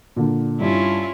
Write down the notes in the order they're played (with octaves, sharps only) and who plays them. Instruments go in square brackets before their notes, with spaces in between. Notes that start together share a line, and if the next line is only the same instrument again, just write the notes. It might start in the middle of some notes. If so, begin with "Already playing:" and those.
[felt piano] A#2 D3
[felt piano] G2 [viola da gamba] C#4 E4 F4